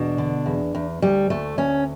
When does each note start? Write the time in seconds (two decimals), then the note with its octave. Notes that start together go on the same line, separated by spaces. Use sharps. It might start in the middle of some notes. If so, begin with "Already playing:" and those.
Already playing: E2 B2 D4
0.18 D3
0.46 E2
0.75 E2
1.02 D2 G3
1.30 D2 A3
1.58 D2 C#4